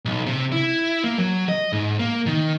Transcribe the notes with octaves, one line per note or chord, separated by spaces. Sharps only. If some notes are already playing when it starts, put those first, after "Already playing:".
B1
C3
E4
A#3
F#3
D#5
G#2
A#3
D#3